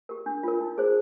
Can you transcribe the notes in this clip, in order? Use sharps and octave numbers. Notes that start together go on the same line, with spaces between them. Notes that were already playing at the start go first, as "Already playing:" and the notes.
G4 A#4
D4
F4 A#4
D#4
G#4 C5